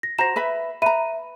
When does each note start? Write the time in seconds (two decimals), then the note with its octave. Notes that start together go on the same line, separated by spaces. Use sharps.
0.03 A#6
0.19 F#4 C5 A#5 A#6 E7
0.36 B4 E5 B5
0.82 B4 E5 A#5 B5 D#7